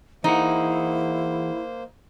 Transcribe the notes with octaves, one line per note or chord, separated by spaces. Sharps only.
E3 A#3 D#4 E4 G#4 C5 F#5